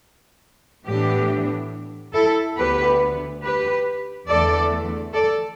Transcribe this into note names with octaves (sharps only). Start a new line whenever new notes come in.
A2 E3 B3 D4 G4
E4 A4
D2 D3 B3 G4 B4
G4 B4
E2 D3 A3 A4 D5
A4 D5